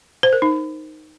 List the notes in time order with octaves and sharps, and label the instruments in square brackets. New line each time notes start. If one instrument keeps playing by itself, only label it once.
[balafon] C5
A#4
D#4